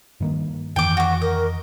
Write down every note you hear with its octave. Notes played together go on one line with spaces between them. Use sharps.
G2 D#3 A#3
F2 D#3 E3 G5 D6
F#4 C#6 D6
A#4 D#5